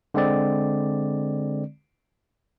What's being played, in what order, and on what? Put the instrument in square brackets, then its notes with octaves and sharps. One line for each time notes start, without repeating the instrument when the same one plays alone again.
[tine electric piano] D3 G#3 C4 D5